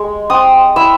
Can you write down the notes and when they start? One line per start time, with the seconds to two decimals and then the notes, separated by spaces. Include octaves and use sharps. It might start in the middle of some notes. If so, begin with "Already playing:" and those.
Already playing: G#3
0.30 C4 D#6
0.76 E4 E6